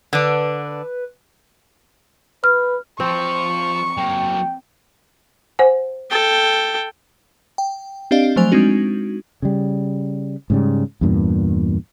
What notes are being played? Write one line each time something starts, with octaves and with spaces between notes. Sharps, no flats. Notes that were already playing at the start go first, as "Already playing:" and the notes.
D3 D4 B4
B4 F6
F3 C4 F4 C#6
F#3 A#3 G5
C5 F#5 G#5
A4 G5
G5
C4 D4 G4 D5 D#5 F5
F3 F#3 A3 C5 G#5 F7
G#3 C4 D4 D#4 F#4
C#3 G3
G#2 C#3 G3
E2 G2 A#2